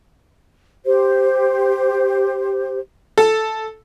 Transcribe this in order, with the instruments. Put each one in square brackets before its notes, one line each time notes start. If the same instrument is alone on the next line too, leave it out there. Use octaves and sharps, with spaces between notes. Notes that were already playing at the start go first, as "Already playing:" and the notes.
[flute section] G4 C5
[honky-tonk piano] A4